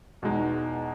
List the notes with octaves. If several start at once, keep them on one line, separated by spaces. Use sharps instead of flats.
E2 B2 G#3 D#4